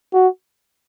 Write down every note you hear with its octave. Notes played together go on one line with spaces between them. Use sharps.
F#4